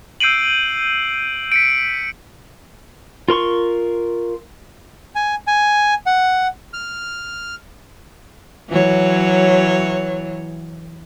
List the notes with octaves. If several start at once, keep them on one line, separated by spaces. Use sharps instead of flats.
E6 G6 C7 D7 D#7 F#7
B6 C#7 D7
F4 A#4 C6 C#6
G#5
G#5
F#5
F6
E3 F#3 C#5